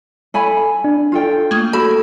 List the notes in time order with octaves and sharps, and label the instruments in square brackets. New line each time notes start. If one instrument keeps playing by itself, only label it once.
[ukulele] A4 G#5 B5
[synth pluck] D4
[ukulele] F4 A4 G5
[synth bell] A3 A#3 [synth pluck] D#6 G#6
[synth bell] F#4 [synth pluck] A4 E6 [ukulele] B5